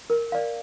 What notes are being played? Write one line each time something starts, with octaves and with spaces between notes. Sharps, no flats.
A#4
D5 F5